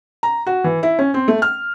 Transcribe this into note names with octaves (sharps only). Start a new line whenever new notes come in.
A#5
F#4
E3
E4
C#4
C4
A3
F6